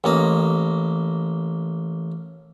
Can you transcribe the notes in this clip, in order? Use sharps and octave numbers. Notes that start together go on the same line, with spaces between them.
A1 A#3 D#5